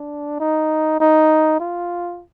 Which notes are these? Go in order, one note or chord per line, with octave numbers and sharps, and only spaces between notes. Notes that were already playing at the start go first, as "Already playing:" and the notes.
Already playing: D4
D#4
D#4
F4